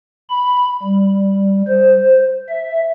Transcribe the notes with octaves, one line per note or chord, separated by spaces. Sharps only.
B5
G3
C5
E5